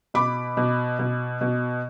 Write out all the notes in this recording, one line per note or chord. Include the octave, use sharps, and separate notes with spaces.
B2 B5 D6
B2
B2
B2